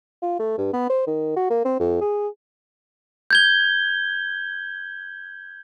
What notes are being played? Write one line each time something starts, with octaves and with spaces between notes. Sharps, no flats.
F4
A3
G2
B3
C5
D#3
F#4
A#3
C4
F2
G#4
G6 G#6 G7